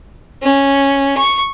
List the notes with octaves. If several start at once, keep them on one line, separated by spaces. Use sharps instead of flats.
C#4
C#6